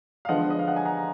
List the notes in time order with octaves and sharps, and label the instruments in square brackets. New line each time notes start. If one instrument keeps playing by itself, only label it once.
[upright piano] F5
D3 F3 G#3 B3 D#5 F#5
D#5
F5
F#5
G#5
F#5 A#5